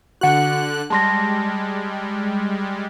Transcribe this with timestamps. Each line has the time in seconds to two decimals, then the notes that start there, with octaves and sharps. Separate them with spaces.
0.21 D3 F#4 F#5 F#6
0.90 G3 G#3 A5 C6 A#6